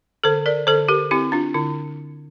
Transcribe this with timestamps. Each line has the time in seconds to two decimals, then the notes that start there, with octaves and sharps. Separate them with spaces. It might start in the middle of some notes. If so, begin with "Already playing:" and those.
0.24 D3 A4 C5
0.46 A#4 D5
0.67 D3 A4 C5
0.89 G4 A#4
1.11 C4 E4 G4
1.32 D4 F4
1.54 D3 E4